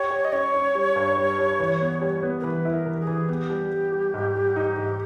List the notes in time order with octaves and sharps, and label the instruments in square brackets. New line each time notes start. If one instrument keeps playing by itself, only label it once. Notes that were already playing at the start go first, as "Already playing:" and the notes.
Already playing: [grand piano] G4 [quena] C#5
[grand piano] G4
[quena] D#5
[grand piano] C#4 [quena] C#5
[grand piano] C#4
G3
G2
G3
G3
E3
B3
G3
B3
[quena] A#4
[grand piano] E3 [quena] B4
[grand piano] E4
[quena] A#4
[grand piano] E3
[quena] G#4
[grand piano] E3
[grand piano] B3 [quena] G4
[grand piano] G3
G3
G3
G#2
G3
D#4
G#2